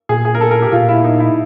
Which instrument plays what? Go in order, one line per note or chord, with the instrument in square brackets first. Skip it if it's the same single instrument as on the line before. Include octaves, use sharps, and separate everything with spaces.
[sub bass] A#2 [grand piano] G#4
[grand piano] G#4
A#4
A4
A#4
G4
[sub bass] A#2 [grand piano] F4
[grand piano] E4
D#4
E4